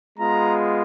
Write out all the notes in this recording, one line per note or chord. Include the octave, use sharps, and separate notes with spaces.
G#3 B3 F4 A#5